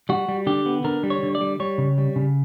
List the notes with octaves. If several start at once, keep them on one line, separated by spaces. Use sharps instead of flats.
G3 F#4
G3
D3 G4
B3
D3 A#4
G3
C#5
D3
D5
G3
G3 C#5
C#3
G3
C#3